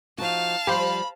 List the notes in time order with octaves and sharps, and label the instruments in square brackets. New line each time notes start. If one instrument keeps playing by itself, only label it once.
[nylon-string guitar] F3 D#4 F#4 [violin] F5 A5
[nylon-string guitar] F3 G3 [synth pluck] G4 C5 [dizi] B5